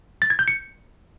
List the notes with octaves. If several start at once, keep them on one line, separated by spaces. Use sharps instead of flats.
A6
G#6
G6
C#7